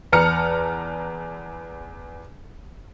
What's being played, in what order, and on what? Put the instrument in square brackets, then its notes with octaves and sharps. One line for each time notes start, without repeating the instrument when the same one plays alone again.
[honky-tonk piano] E2 B4 A5 A#5 F6 C#7